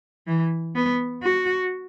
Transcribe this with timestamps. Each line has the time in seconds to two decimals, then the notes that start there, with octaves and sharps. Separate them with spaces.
0.27 E3
0.75 B3
1.23 F#4